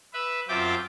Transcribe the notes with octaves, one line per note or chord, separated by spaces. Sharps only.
B4 E5
F#2 C4 F4 E5 G5 D6